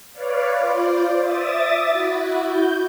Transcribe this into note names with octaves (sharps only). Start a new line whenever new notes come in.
B4 C#5 D5 F5
F4 C5 D5
E5 D6 D#6 A6
E4 F#4
G6